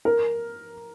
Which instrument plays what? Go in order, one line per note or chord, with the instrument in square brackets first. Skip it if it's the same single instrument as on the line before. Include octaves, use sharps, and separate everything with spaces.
[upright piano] A#4